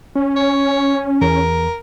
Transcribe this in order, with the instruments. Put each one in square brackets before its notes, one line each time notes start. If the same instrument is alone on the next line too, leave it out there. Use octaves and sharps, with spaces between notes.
[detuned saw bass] C#4
[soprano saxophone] C#5
[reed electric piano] E2 [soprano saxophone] A#4